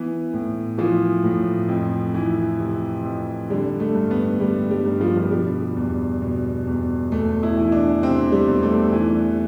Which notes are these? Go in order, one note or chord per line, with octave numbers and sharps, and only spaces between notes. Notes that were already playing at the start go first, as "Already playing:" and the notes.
Already playing: E3 B3
A2
E3 F3
A2
F2
E3
C3
F2
D3 G3
A3
G2
B3
D3 G3
G3
G2
F3
F3
B2 G3
E2
B2
E2
E2 A3
E4
E3
D4
C3 C4
G3
E2
A3
E3